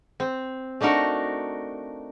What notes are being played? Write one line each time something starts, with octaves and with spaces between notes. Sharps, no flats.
C4
A3 D4 D#4 F#4 A#4